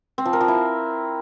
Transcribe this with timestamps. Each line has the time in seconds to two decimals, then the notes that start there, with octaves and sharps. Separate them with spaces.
0.18 C4
0.26 F3
0.33 A#4
0.41 F3
0.48 E4